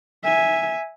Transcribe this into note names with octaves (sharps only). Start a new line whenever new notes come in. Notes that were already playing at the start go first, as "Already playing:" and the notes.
E5 G#5